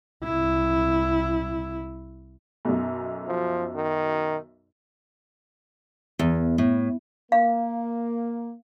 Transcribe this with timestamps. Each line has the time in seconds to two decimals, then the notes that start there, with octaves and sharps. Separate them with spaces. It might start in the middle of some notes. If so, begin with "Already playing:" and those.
0.24 C2 E4
2.65 B1 F#2
3.28 F3
3.75 D#3
6.19 E2
6.58 A2
7.32 A#3 F5